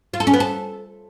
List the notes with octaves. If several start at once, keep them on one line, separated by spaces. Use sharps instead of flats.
F4
A4
C#4
B3
A4